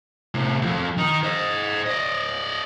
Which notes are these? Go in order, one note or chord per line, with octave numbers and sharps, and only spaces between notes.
A2 C3
C2 F2
D#3 D#4
C5 D#5
D5 D#5